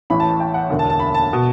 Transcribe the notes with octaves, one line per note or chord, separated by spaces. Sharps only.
A1 A2 E3 B5
A5
A5
G5
F#5
E1 D2 D3
A5
A5
B5
A5
B2